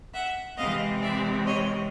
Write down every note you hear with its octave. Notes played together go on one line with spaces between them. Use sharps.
E5 F#5
C3 E3 G#3 C4 D#5 F5
D5 E5
C#5 D#5